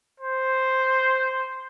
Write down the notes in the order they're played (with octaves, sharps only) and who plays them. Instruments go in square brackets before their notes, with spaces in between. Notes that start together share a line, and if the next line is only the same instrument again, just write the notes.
[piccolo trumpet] C5